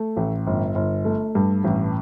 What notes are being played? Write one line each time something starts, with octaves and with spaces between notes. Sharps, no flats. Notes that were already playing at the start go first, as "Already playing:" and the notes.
Already playing: A3
A1
G1
G1
A3
G2
A1